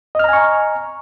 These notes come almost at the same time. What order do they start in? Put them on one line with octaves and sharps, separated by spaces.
D#5 F6 A#5 G#5 C#6